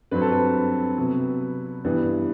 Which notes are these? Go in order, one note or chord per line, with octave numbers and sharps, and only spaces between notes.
G2 F#3 C4 B4
A4
B4
C3 F#3 B3
G2 E3 G3 B3